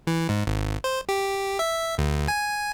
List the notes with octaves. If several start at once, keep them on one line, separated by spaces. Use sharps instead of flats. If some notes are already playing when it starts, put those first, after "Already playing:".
E3
G#2
G#1
C5
G4
E5
D2
G#5